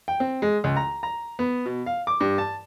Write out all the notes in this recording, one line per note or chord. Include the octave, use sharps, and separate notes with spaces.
G5
C4
G#3
C#2
A#5
A#5
B3
B2
F5
D6
G2
A5